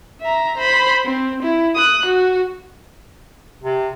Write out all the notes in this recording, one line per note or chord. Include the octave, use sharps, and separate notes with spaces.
E5 A#5
C5 B5
C4
E4
D#6 F#6
F#4
C3